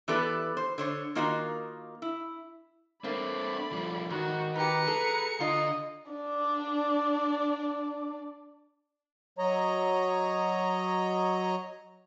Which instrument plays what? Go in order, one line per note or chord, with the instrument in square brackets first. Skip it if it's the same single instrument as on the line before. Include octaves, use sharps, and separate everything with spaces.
[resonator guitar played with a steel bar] E3 B3 G4 A4 B4 D5
C5
D3 C5 C#5
D#3 A#3 D#4 F4 F#4 A#4
E4
[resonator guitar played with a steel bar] A3 A#3 [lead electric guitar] C4 D4 [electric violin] D5 B5
[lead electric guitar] G2 F3
[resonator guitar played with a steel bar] G#2 [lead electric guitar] D#3 [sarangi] F#4
[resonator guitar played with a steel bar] D#4 G4 [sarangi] B4 [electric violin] A#5 C#7
[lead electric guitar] G#4 [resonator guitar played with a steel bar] A4
[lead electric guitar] D3 [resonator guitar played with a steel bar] F4 [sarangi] D#5
[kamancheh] D4 D5
[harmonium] F#3 C#5 D#5 A#5